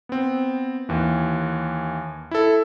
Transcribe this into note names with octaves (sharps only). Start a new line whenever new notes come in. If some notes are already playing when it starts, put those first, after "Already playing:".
B3 C4
D#2 E3
E4 A4